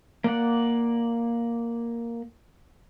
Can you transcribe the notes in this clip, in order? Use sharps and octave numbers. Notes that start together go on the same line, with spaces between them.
A#3 D5 F#5